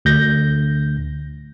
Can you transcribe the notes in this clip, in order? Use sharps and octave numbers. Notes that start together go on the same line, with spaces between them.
D2 G6 A#6